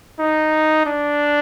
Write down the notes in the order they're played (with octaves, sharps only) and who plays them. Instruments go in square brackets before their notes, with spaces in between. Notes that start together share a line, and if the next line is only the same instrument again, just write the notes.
[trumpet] D#4
D4